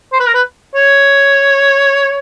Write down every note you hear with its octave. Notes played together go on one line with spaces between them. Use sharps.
C5
B4
A#4
B4
C#5